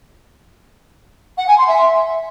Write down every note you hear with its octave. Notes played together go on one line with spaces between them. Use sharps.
F#5
G#5
C6
E5